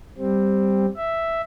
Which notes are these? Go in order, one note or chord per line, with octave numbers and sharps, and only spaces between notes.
G3 C4
E5